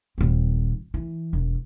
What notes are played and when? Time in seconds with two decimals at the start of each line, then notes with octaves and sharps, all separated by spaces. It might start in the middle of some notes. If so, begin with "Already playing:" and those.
0.18 D#1 C4
0.94 E3
1.33 E1